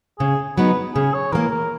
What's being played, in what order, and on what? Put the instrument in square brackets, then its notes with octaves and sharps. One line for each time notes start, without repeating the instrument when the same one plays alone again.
[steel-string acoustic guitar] C#3 [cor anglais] G#4
[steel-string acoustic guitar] F#3 B3 D#4 [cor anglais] B4
[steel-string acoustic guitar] C#3 [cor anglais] G#4
[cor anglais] C#5
[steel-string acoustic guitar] E3 A#3 [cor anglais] A#4
[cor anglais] A#4